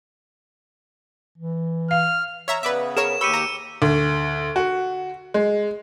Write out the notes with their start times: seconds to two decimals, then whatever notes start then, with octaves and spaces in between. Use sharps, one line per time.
1.38 E3
1.91 F5 F6
2.48 C#5 E5 A#5
2.63 C#3 B3 B4 D5 E5
2.97 G#4 A#4 C#5 E7
3.21 D#2 G4 B5 C#6 E6 C#7 D#7
3.34 A#5
3.82 D2
4.56 F#4
5.34 G#3